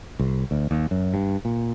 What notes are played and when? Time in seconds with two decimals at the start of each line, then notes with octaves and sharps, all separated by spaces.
0.19 C2
0.51 D2
0.71 D#2
0.91 F#2
1.14 G2
1.45 A#2